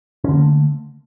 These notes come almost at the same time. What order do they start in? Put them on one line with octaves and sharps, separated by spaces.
C#4 D3 A#3 A3